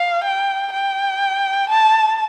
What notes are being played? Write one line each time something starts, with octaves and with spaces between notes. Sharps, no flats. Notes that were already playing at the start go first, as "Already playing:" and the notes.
Already playing: F5
G5
G5
A5